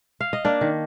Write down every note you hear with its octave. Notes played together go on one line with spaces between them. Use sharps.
F5
D#5
A#3 D4 D5
D#3